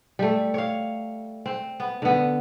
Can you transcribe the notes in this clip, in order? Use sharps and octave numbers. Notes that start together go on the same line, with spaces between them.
G3 A3
C#5 F5
C4
B3
D3 B3